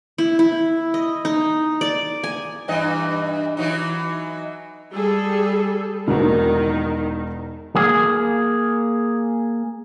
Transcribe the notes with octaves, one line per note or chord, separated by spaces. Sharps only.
E4
E4
D#5
D#4
D5
G#5
G2 E3 D#5
E3 F#3 D#4
G3 G#4 A4
E1 D#3 A#3 F#4
A#3 G#4